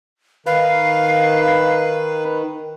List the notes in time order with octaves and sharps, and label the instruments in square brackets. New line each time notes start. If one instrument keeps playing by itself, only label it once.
[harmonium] D#3 [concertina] B4 [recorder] F5